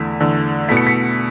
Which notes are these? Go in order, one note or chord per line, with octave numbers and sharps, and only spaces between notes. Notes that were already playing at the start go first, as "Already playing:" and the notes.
Already playing: E2 D3 A3 B6
E2 D3 A3
B2 A3 E4 B6
C#7
B6